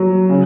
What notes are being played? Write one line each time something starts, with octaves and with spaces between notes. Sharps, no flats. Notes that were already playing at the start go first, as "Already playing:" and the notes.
Already playing: F#3
C#3